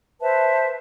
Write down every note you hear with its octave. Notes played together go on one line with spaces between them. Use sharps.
B4 C5 E5 A5